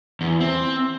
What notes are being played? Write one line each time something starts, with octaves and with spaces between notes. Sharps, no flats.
E2
C4